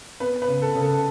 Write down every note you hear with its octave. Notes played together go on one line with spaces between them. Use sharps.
B3 B4
B4
C#3
A4
C#3
A4